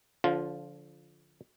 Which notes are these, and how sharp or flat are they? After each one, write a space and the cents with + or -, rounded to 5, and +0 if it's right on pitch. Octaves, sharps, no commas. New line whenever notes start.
D3 -25 F3 +5 F4 +0